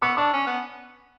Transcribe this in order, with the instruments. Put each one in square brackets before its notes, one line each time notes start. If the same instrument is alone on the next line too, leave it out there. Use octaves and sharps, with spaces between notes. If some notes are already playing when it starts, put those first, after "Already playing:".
[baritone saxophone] B3 [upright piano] C#6 E6
[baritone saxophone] D4 [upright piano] C#6 E6
[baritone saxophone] C#4
B3